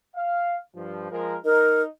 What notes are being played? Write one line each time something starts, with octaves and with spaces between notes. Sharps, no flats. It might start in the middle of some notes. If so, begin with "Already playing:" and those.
F5
G2 F3
F3 G#3 A#4
D#4 A#4